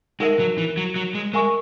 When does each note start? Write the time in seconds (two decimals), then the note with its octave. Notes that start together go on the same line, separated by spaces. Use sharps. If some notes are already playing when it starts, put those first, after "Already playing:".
0.20 G#3 D#4 A#4 E5
0.39 F#3
0.58 E3
0.77 F#3
0.96 F#3
1.15 G#3
1.33 G#3 A#4 E5 G#5 C#6